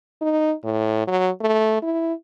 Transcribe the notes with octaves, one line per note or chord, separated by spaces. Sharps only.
D#4
A2
F#3
A3
E4